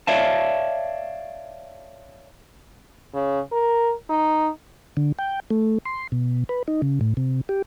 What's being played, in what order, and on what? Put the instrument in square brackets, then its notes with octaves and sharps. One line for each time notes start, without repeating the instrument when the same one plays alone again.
[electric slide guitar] C#5 D5 E5 F5 A5
[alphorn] C#3
A#4
D#4
[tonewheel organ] D3
G5
A3
C6
B2
B4
D#4
C#3
A2
C3
G4